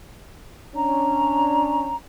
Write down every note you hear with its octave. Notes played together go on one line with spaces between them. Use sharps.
C#4 D4 A#5